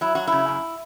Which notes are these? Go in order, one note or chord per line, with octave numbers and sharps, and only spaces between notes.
F#3 E4
F#3 F#4
C#3 E4
F#2